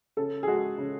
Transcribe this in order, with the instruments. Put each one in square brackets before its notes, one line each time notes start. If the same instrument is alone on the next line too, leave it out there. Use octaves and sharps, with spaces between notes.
[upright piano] C#3 A4
G#4
G#3 F#4
C#3